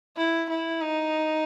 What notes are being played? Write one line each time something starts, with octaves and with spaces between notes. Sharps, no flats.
E4
E4
D#4